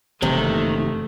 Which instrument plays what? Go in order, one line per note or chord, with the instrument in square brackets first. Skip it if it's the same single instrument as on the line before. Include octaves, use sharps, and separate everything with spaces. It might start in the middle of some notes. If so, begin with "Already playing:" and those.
[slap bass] F#1 G2 E3 [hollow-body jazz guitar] C3 [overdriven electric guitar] D#3 [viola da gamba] A3 A#3